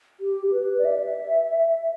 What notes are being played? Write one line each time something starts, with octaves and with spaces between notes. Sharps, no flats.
G4
B4
D5
E5